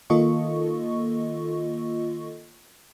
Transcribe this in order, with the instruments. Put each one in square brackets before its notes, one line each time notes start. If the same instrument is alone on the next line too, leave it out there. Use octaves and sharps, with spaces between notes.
[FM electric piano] D#3 A#3 F4 A4 D#5 C#6